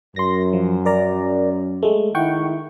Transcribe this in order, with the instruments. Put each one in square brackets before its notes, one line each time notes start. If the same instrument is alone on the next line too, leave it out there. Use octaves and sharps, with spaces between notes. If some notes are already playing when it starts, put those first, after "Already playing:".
[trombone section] F#2 [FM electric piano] C6 A#6
[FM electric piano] F3
A#4 D5 A#5
G#3 A3
[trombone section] D#3 E4 [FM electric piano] F#5 G5 C#6